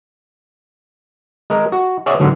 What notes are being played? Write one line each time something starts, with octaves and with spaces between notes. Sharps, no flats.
G#3 A#4
F#4
G#4 C#5 D5 E5 F#5
G#2 D3 F#3